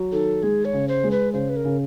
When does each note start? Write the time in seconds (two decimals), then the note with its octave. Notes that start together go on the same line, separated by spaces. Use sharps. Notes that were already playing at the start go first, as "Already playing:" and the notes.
Already playing: F#3
0.12 D#3 A4
0.43 G#3 G#4
0.65 C#5
0.73 C#3
0.88 C5
1.04 G#3
1.11 B4
1.33 C#3 C5
1.49 B4
1.56 A#4
1.65 C#3